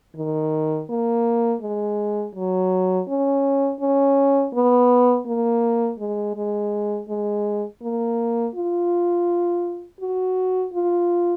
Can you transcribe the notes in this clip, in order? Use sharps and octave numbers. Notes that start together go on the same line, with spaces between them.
D#3
A#3
G#3
F#3
C#4
C#4
B3
A#3
G#3
G#3
G#3
A#3
F4
F#4
F4